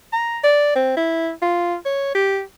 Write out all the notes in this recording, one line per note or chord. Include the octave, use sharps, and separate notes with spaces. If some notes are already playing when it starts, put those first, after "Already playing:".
A#5
D5
C4
E4
F4
C#5
G4